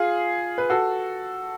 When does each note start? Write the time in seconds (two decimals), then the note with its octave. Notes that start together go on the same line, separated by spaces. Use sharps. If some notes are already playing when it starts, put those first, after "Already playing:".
Already playing: F4 G#4
0.58 B4
0.70 F#4 A4